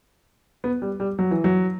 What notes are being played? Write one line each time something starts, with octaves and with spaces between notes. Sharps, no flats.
B3
G3
G3
F#3
E3
F#3